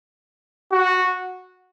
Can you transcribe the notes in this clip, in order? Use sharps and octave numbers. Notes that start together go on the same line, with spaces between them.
F#4